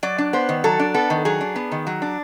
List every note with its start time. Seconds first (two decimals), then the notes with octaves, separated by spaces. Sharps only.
0.03 F#3 D5
0.18 D4
0.33 B3 C5
0.49 D#3
0.64 F#3 A4
0.79 D4
0.94 B3 A4
1.10 D#3
1.25 F#3 G#4
1.41 D4
1.56 B3
1.72 D#3
1.87 F#3
2.02 D4